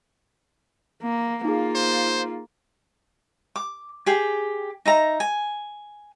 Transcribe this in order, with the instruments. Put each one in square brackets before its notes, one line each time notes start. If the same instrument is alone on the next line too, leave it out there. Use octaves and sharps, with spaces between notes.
[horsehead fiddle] A#3
[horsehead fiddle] A#3 F4 [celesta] D#4 G#4
[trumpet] C5
[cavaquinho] D6
G4 G#4 G5
D#4 E5 A#5
G#5